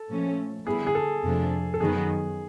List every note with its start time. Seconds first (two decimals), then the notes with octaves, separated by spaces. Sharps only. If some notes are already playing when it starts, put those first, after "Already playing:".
Already playing: A4
0.09 A#2 F3 A3 C#4
0.66 D3 G3 B3 E4 G#4
0.87 G#4
0.95 A4
1.23 F2 C3 F3 A3 D4
1.74 A4
1.80 F#2 D#3 F#3 B3 G#4